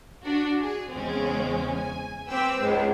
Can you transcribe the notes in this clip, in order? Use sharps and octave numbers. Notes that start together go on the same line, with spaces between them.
D4 F#4
G#4
E2 C#3 G#3 C4 C#4
G#5
C4 B4 G5 D6 E6
C#2 G#2 G#3 C5